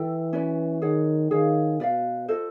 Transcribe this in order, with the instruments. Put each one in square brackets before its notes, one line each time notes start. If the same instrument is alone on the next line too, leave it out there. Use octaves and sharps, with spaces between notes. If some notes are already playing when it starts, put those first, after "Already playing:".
Already playing: [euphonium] E3 [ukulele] E4 A4 D5 G5
[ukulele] C#4 F#4 B4 D5
[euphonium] D#3 [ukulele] G#4 C#5 F#5
[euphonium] D#3 [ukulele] G#4 C#5 F5
[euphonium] B2 [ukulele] B4 D5 F5
[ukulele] F4 A4 C5 D#5